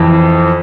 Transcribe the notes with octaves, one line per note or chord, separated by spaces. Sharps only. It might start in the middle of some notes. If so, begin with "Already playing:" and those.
Already playing: F2 E3